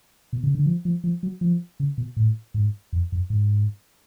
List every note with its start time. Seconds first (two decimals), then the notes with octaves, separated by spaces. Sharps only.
0.33 B2
0.44 C#3
0.55 D3
0.66 F3
0.85 F3
1.04 F3
1.23 F#3
1.41 F3
1.80 C#3
1.98 B2
2.17 A2
2.54 G#2
2.93 F2
3.12 F#2
3.30 G#2